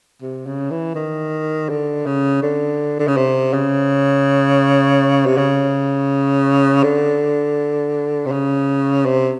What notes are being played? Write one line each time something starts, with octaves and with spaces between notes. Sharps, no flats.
C3
C#3
E3
D#3
D3
C#3
D3
D3
C#3
C3
C#3
C3
C#3
D3
C3
C#3
C3